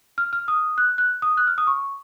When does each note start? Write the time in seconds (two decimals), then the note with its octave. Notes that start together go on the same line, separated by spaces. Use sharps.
0.18 F6
0.33 F6
0.48 D#6
0.78 F#6
0.98 F#6
1.22 D#6
1.37 F#6
1.47 F6
1.58 D#6
1.67 C#6